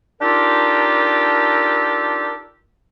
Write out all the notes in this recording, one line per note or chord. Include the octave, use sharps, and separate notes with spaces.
D4 D#4 F4 G4 A4 A#4